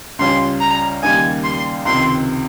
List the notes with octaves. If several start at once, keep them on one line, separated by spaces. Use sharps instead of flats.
C#2 C#3 G3 C#4 F4 C6
A#5
D#2 C#3 G3 A#3 D#4 G#5
C6
C#2 C3 D#3 C6